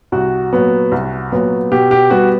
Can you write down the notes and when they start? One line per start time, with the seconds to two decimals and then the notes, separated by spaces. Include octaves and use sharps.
0.12 C2 F#4
0.53 A#2 F#3 B3
0.92 C2
1.32 A#2 F#3 B3
1.72 B2 G4
1.91 G4
2.10 G3 B3 F#4